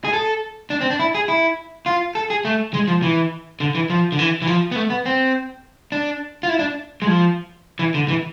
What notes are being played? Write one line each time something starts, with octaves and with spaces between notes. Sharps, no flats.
G#4
A4
D4
C4
D4
E4
G#4
E4
F4
A4
G#4
A3
G#3
F3
E3
D3
E3
F3
D3
E3
E3
F3
B3
A3
B3
C4
D4
F4
E4
D4
G#3
F3
E3
D3
E3